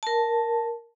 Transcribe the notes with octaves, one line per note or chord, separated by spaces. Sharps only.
A#4 A5